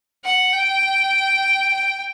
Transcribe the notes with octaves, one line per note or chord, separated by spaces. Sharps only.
F#5
G5
G5